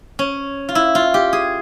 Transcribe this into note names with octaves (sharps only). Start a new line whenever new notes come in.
C#4
F4
E4
F4
G4
G#4